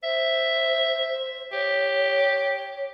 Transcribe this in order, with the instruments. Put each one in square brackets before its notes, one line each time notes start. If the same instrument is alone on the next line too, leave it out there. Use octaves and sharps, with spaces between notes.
[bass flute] C5 [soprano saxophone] E5
[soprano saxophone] G4 [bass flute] C#5